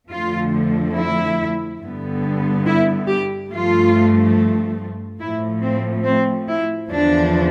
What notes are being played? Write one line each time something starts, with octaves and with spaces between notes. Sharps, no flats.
F2 D3 F3 A3 F4
E4
G2 D3 G3 B3
E4
G4
G2 F3 A3 F4
A2 F3 A3 E4
C4
C4
E4
E2 D3 F3 D4